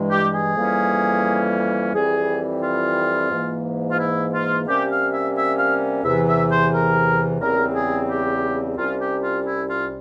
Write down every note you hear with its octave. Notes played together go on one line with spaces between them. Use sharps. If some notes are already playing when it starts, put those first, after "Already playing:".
Already playing: G2 E3 G#3
G4
G#4
F2 E3 G3 A#3 C#4
F2 E3 G3 C4 G#4
F4
G#2 E3 A#3
F4
E4
F4
C3 G3 A#3 C#4 G4
F5
E5
E5
F5
E2 C3 E3 E5
E5
C5
A#4
E2 C#3 G3 C4 A#4
G#4
G4
C2 C3 G3 C#4 F4
G4
F4
E4
F4